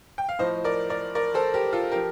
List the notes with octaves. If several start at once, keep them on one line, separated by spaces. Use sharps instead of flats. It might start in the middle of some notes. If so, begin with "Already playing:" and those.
G5
F5
A2 F3 C5 D#5
A#4 D5
A#4 D5
A#4 D5
A4 C5
G4 A#4
F4 A4
F3 G4 A#4